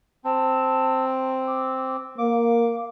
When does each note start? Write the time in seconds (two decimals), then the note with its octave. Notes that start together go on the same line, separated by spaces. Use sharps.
0.24 C4 A5
1.47 D6
2.18 A#3 F5 D6